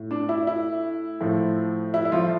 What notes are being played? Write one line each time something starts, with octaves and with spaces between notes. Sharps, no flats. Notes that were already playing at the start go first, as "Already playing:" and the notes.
Already playing: A2
D4
E4
E4
A2 F3
E4
E4
F3 F4